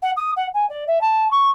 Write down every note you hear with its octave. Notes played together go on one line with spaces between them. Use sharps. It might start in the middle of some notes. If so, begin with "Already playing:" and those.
F#5
D#6
F#5
G#5
D5
E5
A5
C#6